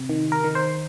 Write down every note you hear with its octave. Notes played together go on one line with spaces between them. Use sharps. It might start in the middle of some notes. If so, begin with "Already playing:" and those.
Already playing: C3
D#3
A#4
D#3
C5